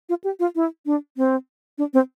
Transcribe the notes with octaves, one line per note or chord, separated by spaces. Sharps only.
F4
G4
F4
E4
D4
C4
D4
C4